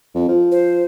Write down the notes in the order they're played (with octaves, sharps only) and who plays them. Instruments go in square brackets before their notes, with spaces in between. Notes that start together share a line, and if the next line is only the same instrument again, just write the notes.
[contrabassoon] F2
F3
[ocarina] C5